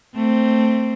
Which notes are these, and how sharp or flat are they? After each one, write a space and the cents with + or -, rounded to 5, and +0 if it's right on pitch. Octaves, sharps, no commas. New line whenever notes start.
A3 +20 C4 +0